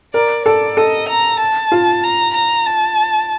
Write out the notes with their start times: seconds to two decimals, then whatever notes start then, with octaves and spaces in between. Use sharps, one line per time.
0.14 A#4 D5
0.46 A4 D5
0.77 A4 D#5
1.09 A#5
1.40 A5
1.72 F4
2.04 A#5
2.34 A#5
2.66 A5